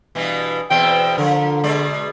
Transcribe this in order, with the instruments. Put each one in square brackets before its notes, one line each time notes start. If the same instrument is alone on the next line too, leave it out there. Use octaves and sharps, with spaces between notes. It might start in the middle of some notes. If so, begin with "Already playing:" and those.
[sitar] G2 B2 E3
[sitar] E2 B2 C4 [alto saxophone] G5
[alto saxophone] D3 [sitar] F3 A#4
[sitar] B2 G#3 D5